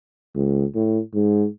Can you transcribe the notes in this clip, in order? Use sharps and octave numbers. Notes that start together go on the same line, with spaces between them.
C#2
A2
G#2